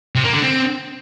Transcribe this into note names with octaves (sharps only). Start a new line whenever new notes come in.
C3
A#3
D3
C4